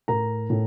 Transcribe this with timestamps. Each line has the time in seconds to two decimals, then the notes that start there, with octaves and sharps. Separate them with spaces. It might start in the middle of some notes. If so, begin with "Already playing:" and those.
0.08 A2 A#4 A#5
0.50 A2